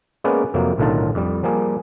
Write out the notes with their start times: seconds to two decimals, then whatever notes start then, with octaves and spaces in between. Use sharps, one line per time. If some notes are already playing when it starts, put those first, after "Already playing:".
0.24 G#3 A#3 B3 C#4 B4 D5
0.54 F2 C3 F#3 A#3
0.78 B1 A2 D3 D#3 F4 A5
1.15 F2 G3
1.43 F3 G3 A#3 G#4